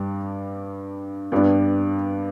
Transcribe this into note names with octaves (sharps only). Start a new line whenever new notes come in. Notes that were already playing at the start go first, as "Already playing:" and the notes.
Already playing: G2 G3 D4
G2 G3 B3 D4